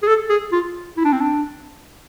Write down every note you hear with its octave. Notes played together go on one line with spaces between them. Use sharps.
G#4
A4
G#4
F4
E4
D4
C4
D4